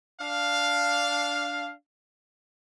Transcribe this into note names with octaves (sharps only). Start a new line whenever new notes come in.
D4 F5